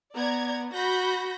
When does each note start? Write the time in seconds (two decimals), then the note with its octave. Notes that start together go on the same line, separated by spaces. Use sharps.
0.14 B3 D5 A#5 G#6
0.73 F#4 B5 G6 A#6